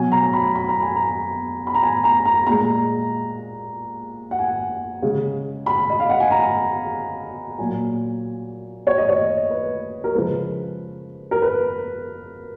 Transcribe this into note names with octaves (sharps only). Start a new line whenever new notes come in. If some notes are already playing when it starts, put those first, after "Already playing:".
Already playing: B2 F#3 G#5
A#5
B5
B5
A#5
G#5
A#5
B5
A#5
G#5
A#5
A#5
A#2 G#3 A#5
F#5
G#5
C#3 G#3
B5
D#5
F5
F#5
G#5
A#5
A#2 F#3 G#5
C#5
D#5
C#5
B4
A#4
C#3 F3 G#3 B4
A#4
B4